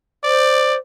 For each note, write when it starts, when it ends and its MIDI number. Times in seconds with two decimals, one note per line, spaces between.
0.24 0.78 72
0.24 0.76 74